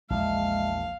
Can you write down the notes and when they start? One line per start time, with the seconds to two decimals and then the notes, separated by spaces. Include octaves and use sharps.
0.10 A#1 E2 G#3 E5 F5 A5